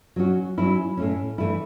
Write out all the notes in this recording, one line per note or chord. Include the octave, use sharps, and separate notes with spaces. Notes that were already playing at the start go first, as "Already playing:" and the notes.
F#3 C#4 F#4
F#3 C#4 E4
A2 A3 C#4
E3 A3 E4